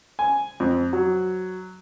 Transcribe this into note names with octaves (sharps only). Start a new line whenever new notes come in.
G#5
F2
F#3